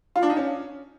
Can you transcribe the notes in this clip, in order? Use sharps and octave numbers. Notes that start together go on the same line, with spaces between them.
F4
D4
D#4
C#4